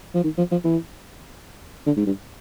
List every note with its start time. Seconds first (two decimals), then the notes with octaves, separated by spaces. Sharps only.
0.14 F3
0.24 D#3
0.38 F3
0.51 F3
0.64 E3
1.86 D3
1.97 G#2
2.06 G2